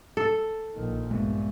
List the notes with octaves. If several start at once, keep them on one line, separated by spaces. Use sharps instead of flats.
A4
A#1 D#3
G2 G#3 B3